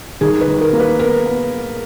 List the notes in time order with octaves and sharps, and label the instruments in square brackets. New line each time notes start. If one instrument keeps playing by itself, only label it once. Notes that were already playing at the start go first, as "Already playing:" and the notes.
[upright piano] D#3 [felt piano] G#4
[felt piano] B4
[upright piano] D#3
[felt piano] A#4
[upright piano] A#3
[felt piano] B4
[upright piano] B3 [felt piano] A#4
[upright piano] B3